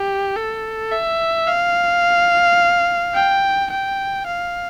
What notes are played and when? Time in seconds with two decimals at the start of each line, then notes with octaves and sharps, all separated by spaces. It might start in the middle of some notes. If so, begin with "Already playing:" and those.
Already playing: G4
0.37 A4
0.92 E5
1.47 F5
3.14 G5
3.71 G5
4.26 F5